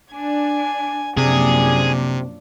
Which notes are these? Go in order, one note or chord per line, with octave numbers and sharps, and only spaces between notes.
D4 G#5
F#2 C3 F3 A#3 D4 G#4